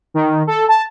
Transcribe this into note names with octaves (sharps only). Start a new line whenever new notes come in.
D#3
A4
A5